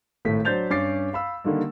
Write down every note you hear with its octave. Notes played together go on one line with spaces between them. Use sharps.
G#1 A2 A3 B6
F#3 D4 C5 G6 A6 F7
G2 C#4 D6 A6 C7
F5 B5 E6
D3 D#3 G3 A#3